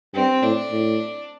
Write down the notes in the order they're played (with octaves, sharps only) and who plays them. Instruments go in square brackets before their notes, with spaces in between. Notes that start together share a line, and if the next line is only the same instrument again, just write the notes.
[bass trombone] G2 [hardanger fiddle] C4
[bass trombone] A2 [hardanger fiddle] D4
[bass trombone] A2